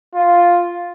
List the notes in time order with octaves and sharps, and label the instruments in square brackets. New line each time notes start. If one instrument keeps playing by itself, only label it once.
[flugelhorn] F4